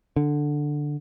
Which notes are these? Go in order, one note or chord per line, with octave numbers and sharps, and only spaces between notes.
D3